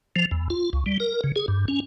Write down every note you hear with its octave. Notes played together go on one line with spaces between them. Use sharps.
F3
E2
F4
C#2
G3
A#4
C#3
G#4
G2
C#4